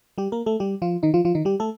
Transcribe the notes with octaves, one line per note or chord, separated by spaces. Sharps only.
G3 G4
A#3 A#4
A3 A4
G3 G4
F3 F4
D#3 D#4
F3 F4
F3 F4
D#3 D#4
G3 G4
A3 A4